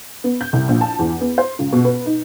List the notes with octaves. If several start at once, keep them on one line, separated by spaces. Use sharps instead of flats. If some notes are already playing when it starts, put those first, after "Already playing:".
B3
G6
C2
A#1
A5
E2
B3
C5
C#2
B2
B4
D#4